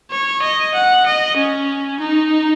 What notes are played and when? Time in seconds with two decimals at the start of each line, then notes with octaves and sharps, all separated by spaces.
0.11 C#5
0.42 D#5
0.75 F#5
1.06 D#5
1.37 C#4
2.00 D#4